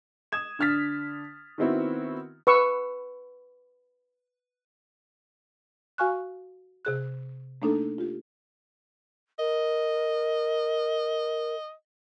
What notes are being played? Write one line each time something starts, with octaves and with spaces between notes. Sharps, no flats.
D#6 G#6 E7
D3 D4 F6 A6 B6
D#3 B3 C4 E4 F#4
B4 C#6 E6
F#4 F5 G#5 C#6 F6 F#6
C3 G#4 F#6
A3 A#3 D4 D#4 A4
F4 G4
A#4 D#5